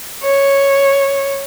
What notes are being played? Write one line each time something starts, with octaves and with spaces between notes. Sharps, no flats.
C#5